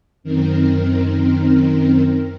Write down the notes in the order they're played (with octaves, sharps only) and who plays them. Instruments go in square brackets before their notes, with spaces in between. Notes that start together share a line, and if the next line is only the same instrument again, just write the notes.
[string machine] F#2 D#3 C4 A#4